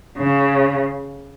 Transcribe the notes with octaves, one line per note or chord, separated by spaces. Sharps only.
C#3